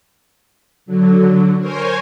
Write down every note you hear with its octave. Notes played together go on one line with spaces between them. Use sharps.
D3 F#3
A#4 C5 C#5 G#5